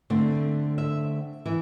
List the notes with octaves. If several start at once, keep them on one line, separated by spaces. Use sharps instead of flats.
D3 A3 C4
E5
E3 E5